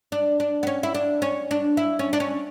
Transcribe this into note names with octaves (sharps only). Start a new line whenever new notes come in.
D4
D4
B3
C#4
E4
D4
C#4
D4
E4
C#4
D4
C#4